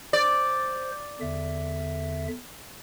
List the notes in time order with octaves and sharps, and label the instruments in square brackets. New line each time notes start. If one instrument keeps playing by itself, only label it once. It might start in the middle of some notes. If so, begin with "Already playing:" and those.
[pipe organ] C5 [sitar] D5
[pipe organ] E2 D3 E5